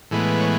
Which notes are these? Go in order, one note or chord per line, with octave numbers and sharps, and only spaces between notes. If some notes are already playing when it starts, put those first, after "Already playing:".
A2 E3 G#3 B3
C#5